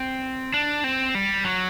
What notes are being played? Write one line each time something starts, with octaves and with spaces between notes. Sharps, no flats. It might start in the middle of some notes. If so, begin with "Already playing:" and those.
Already playing: C4
D4
C4
G3
F#3